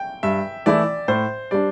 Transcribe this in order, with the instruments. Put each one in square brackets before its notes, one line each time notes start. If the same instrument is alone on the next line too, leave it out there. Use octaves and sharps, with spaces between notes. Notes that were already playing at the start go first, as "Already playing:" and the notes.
Already playing: [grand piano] G5
[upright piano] G2 [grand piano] E5
[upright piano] E3 A3 E4 [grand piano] D5
[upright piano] A2 [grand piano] C5
[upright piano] G3 D4 [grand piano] D5